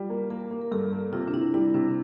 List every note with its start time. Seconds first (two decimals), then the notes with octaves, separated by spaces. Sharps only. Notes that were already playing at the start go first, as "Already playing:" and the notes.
Already playing: G3 F4
0.10 A#3
0.30 A#3 A#4
0.51 A#3
0.61 A#4
0.72 G2 A4
0.92 A#3
1.12 C3 F4
1.28 D4
1.33 C3 E4
1.54 G3 E4
1.74 C3 D4